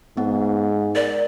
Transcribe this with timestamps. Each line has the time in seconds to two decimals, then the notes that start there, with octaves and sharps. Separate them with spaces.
0.17 G#2 B3 F#5
0.96 A#4 D5